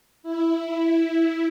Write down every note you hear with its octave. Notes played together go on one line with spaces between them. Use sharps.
E4